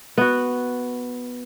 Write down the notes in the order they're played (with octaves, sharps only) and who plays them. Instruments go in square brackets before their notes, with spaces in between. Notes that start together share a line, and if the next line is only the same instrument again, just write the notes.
[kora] B3 F#4